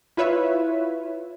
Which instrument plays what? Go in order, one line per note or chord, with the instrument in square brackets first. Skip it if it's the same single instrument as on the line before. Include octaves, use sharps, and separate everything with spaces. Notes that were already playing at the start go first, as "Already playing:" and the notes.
[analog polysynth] E4 F4 B4 C#5 E5